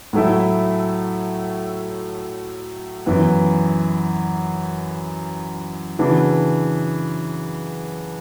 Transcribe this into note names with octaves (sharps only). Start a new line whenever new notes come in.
A2 F#3 A3 E4
F#2 E3 B3
C#3 E3 B3 D4 F#4